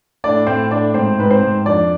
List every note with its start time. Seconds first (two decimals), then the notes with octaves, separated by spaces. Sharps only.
0.24 A2 D4 D5
0.47 A2 C4 C5
0.71 A2 D4 D5
0.94 G#2 C4 C5
1.18 G#2 B4
1.31 C4 C5
1.43 G#2
1.66 F2 D4 D5